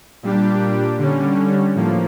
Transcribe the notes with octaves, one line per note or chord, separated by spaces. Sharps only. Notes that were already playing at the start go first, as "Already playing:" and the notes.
A#2 G3 D4 G4
D3 G3 C#4
A2 F3 A#3